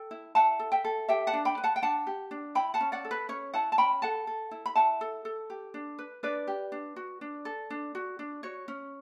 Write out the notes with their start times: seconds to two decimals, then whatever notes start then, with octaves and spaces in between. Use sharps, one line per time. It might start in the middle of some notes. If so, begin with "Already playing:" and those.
Already playing: A4 G5
0.11 E4
0.35 E4 F#5 A5
0.59 A4
0.72 E5 G5
0.85 A4
1.09 G4 E5 G5
1.27 F#5 A5
1.33 D4
1.45 G5 B5
1.58 B4
1.64 F#5 A5
1.76 G5
1.82 D4 F#5 A5
2.07 G4
2.31 D4
2.55 E4 G5 B5
2.74 F#5 A5
2.81 C#4
2.92 D5 F#5
3.05 A4
3.11 B4
3.29 C#4 C#5
3.54 E4 F#5 A5
3.72 A5
3.78 C#4 G5 B5
4.02 A4 F#5 A5
4.27 A4
4.51 E4
4.66 B5
4.76 E4 F#5 A5
5.01 A4
5.25 A4
5.50 G4
5.74 D4
5.99 B4
6.23 D4 B4 D5
6.47 G4
6.72 D4
6.96 F#4
7.21 D4
7.45 A4
7.70 D4
7.95 F#4
8.19 D4
8.43 F#4 C#5
8.68 C#4